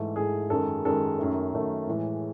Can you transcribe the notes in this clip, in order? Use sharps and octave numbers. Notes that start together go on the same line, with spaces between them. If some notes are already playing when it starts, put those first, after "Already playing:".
Already playing: G#2 E3 A3
G#2 E3 A3 G#4
F#2 D#3 G#3 A4
F#2 D#3 G#3 A4
F#2 D#3 A3
F#2 D#3 A3
A2 E3 G#3